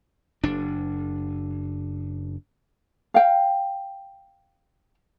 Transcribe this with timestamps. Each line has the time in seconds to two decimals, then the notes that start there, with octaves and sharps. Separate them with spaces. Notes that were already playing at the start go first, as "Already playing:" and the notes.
0.43 F#1 D4
3.14 F5 G5